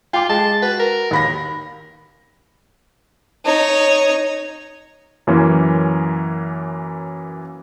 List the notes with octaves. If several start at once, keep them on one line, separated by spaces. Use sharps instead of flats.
F4 G5 D6
G#3 A5
F#4 B4
A#4
D#2 B5 A#6
D#4 C#5
F#2 E3 A#3 C#4